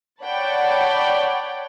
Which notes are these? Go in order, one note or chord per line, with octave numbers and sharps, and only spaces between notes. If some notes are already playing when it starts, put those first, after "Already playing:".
C#5 D5 F#5 G5 A5 B5